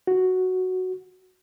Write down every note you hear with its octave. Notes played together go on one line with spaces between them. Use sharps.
F#4